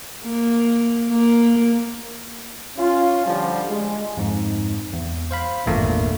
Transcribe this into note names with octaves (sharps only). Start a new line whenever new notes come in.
A#3
A#3
C#4 F4
D3 F3 G3
G#3
F2 G#2
E2
C5 F5 B5
G#1 E2 G2 A#2 A3 A#3